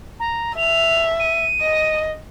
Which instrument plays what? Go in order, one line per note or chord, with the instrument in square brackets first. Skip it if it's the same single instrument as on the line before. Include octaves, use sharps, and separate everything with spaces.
[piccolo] A#5
[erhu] E5 [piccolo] F7
[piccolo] D#7
[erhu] D#5